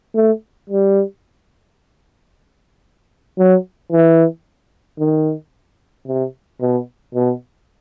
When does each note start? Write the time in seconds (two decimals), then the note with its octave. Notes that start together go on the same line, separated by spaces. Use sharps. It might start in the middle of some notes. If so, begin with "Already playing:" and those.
0.15 A3
0.70 G3
3.38 F#3
3.92 E3
5.00 D#3
6.08 C3
6.61 B2
7.15 B2